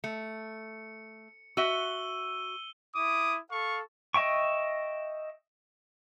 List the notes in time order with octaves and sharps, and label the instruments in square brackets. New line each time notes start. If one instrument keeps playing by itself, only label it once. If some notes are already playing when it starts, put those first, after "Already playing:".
[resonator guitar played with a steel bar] A3 [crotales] C#7
[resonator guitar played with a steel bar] F#4 E5 [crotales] E6 D#7 G7
[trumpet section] E4 D6 D#6
A4 F5 C#6
[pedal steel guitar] D#5 E5 G5 C#6